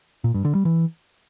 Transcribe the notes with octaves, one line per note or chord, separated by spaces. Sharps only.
A#2
G2
D3
G3
E3